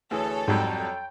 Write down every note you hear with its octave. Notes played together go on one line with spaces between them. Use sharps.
D2 E3 G#4 A4 C#5
F2 G#2 F#3 G3 G5